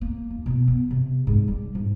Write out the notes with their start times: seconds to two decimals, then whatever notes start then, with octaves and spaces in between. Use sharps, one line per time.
0.01 A#3
0.30 D#2
0.46 B2
0.68 B3
0.90 C3
1.27 G#2
1.48 G3
1.75 G#2